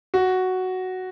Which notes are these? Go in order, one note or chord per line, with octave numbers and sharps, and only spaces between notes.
F#4